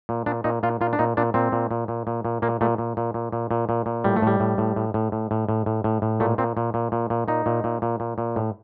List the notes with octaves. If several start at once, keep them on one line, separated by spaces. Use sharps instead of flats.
A#2
A#2 D4
A#2 D#4
A#2 F4
A#2 F4
D4
A#2 D#4
A#2 D4
A#2 C4
A#2
A#2
A#2
A#2
A#2
A#2 A#3
A#2 A3
A#2
A#2
A#2
A#2
A#2
A#2
A#2
A2 G3
A3
A2 G3
A2
A2
A2
A2
A2
A2
A2
A2
A2
A2
A#2 A3
A#2 C4
A#2
A#2
A#2
A#2
A#2 D#4
A#2
A#2
A#2
A#2
A#2
A2